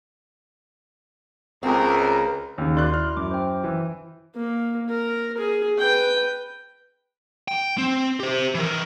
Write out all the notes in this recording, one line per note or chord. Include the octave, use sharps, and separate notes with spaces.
C#2 C4 G#4 A#4
D#2 C#3
F#4 A#4 D5 C6 F#6
E4 F6
F#2 D6
C5 G5
E3
A#3
A#4
G#4
B4 G5
G5
C4
G4 C5
E3 A#4